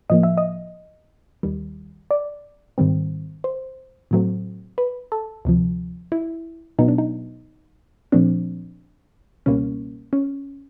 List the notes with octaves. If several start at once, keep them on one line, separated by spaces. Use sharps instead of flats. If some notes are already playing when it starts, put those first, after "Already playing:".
A2 F3 A#3 D#5
E5
D#5
D#2 D#3 G3
D5
G#2 D#3 G3 C4
C5
A2 F#3 A3 C4
B4
A4
D2 C3 F3
E4
B2 F#3 B3 D#4
D4
D#4
A#2 F3 A3 C4 D4
C#2 B2 G3 A#3 C#4
C#4